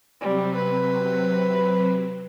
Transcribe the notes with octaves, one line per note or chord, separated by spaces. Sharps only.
C3 F#3 G3 C4
B4